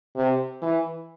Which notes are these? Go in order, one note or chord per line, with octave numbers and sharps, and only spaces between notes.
C3
E3